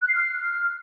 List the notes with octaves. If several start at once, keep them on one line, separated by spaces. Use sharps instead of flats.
F#6
C7
F6